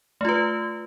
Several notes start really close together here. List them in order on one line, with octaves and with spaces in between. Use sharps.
A3 F4 B4